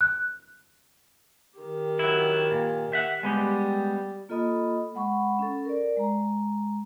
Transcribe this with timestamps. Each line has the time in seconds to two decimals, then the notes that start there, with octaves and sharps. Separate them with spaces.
0.01 F#6
1.58 D#3 G4
1.99 F#3 E4
2.51 A#2
2.93 E5 F#5
3.23 G3 G#3 B3 G4
4.29 A#3 F4 A4 D#5 B5 D#6
4.95 G#3 F#5 B5 C#6
5.39 C#4 A4
5.65 A#4 D5
5.97 G#3 A#5